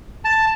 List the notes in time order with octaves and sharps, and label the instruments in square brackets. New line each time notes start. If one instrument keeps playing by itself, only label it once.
[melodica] A5